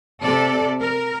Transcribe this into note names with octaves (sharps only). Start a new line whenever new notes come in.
C3 A4 D5
A#4